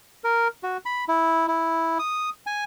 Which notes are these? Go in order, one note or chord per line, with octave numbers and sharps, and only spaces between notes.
A#4
F#4
B5
E4
E4
D#6
G#5